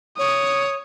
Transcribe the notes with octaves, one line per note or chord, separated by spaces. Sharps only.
C#5 D#6